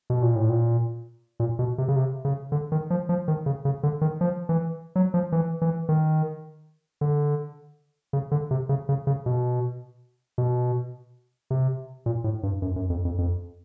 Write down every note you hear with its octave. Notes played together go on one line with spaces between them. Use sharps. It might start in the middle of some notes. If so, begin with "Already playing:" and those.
B2
A#2
A2
A#2
A#2
B2
C3
C#3
C3
C#3
D3
D#3
F3
F3
D#3
C#3
C#3
D3
D#3
F3
E3
F#3
F3
E3
E3
D#3
D3
C#3
D3
C3
C#3
C#3
C#3
B2
B2
C3
A#2
A2
G2
F#2
F#2
F2
F2
F2